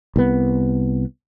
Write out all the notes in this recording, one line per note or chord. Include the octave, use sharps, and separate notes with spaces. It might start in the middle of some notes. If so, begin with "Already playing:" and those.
C2 B3